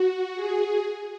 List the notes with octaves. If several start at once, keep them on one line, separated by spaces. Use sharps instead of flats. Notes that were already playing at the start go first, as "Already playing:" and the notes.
Already playing: F#4
G#4